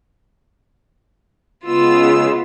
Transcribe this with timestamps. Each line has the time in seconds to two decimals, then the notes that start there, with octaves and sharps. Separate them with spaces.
1.65 C#3 G#3 B3 F4 E6